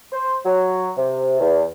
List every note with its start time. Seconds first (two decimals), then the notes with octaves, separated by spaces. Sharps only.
0.12 C5
0.45 F#3
0.97 C3
1.40 E2